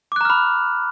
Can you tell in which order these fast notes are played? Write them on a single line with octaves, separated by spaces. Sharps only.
D6 F#6 A#5 F6 B5